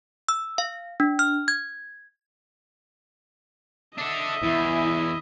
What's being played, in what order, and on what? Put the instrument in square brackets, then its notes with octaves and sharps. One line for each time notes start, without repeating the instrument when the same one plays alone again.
[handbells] E6
F5
D4
F6
G#6
[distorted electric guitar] D4 A4 [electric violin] D#5 E5
[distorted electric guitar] E2 [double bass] E4